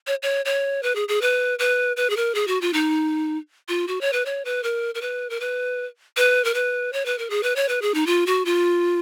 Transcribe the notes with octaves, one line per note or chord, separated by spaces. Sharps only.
C#5
C#5
C#5
B4
G#4
G#4
B4
B4
B4
G#4
A#4
G#4
F#4
F4
D#4
F4
F#4
C#5
B4
C#5
B4
A#4
A#4
B4
A#4
B4
B4
A#4
B4
C#5
B4
A#4
G#4
B4
C#5
B4
G#4
D#4
F4
F#4
F4